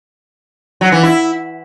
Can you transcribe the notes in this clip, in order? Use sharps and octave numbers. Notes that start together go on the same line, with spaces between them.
F#3
E3
E4